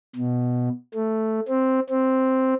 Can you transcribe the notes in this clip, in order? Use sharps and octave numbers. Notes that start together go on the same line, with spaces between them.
B2
A3
C4
C4